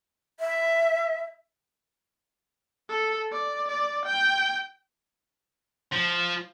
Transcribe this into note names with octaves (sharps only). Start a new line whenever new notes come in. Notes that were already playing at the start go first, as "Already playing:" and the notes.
E5
A4
D5
D5
G5
F3